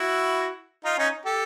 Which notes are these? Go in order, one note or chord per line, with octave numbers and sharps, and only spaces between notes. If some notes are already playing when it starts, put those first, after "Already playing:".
Already playing: E4 F#4
D#4 F4
C#4 D#4
G4 A4